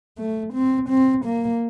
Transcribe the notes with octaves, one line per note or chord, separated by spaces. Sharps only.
A3
C4
C4
A#3